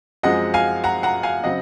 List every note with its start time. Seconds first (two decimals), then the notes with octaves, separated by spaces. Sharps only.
0.23 F#2 F3 G#3 C4 D#5 F#5
0.54 F5 G#5
0.84 F#5 A#5
1.03 F#5 A#5
1.23 F5 G#5
1.44 C#3 F#3 C4 D#5 F#5